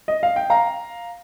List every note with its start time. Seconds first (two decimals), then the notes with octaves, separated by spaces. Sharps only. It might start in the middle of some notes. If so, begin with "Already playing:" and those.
0.08 D#5
0.23 F5
0.36 G5
0.50 F5 A#5